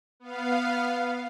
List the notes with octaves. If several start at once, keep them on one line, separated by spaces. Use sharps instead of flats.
B3 F5